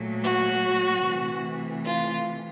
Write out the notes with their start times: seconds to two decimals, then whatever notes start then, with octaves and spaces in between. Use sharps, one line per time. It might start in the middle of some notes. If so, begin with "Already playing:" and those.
Already playing: A#2 F#3 A3
0.23 F#4
1.04 C3 E3 A3
1.85 F4